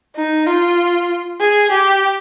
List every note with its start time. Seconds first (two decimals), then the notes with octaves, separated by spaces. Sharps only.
0.16 D#4
0.47 F4
1.40 G#4
1.71 G4